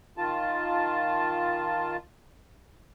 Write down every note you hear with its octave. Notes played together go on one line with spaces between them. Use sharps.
D#3 F4 A5